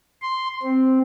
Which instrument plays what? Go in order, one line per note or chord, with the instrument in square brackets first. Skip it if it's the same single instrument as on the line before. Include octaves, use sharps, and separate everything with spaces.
[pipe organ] C6
C4